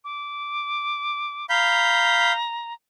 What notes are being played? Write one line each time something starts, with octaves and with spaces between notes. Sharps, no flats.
D6
F5 A#5 B5 G6